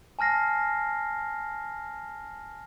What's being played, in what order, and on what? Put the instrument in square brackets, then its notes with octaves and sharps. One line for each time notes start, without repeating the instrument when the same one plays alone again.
[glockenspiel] G#5 A5 F6 A#6 C7